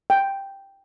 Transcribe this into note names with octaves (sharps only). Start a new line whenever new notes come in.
G5